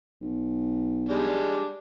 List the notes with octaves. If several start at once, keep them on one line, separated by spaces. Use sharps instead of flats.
B1
G3 G#3 D4